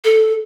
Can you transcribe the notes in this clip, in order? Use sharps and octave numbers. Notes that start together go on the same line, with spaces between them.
A4